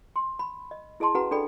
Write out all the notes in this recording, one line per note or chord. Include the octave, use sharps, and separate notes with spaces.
C6
B5
D#5
E4 G#4 D#5 A5 C6
C#4 F#4 G#4 B4 F#5 A#5
D4 G#4 A4 D5 G5 B5